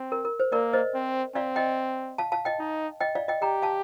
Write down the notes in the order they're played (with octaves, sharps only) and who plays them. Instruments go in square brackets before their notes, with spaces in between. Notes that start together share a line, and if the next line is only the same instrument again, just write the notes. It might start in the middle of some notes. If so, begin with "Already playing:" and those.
Already playing: [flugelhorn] C4
[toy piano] A#4
A#4
C5
[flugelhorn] A#3 [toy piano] A#4 D5
[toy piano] C5 D#5
[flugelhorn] C4
[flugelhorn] C4 [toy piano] D5 F5
[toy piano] D#5 G5
F5 A5
F5 A5
D#5 G5
[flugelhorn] D#4
[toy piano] D#5 G5
D5 F5
D#5 G5
[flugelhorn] G4 [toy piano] G5 A#5
[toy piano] F5 A5